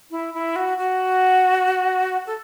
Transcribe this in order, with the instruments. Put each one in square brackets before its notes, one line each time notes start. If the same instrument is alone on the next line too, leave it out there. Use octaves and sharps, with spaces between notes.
[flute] E4
E4
F#4
F#4
A4